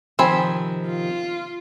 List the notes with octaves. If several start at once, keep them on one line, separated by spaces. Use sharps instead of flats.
C3 D#3 F3 C4 G#5 B5
F4